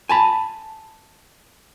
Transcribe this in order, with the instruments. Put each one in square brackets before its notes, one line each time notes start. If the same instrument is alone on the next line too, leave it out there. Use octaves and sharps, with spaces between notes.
[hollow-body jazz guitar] G#5 A5 B5